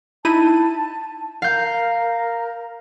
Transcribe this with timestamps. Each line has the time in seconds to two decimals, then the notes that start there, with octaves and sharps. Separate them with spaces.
0.25 D#4 E4 A5 D#7
1.42 A#4 F5 G6